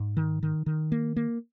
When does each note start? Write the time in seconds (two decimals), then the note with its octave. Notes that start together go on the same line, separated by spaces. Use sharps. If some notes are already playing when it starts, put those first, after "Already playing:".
Already playing: G#2
0.17 D#3
0.43 D#3
0.66 D#3
0.92 A#3
1.16 A#3